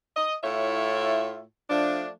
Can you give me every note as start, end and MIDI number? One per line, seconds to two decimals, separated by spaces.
0.17 0.34 75
0.44 1.43 45
0.44 1.43 64
0.44 1.43 65
0.44 1.43 73
0.44 1.43 76
1.70 2.10 53
1.70 2.10 57
1.70 2.10 62